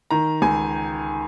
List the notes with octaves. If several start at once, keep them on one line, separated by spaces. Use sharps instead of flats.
D#3 A#5
C#2 G#5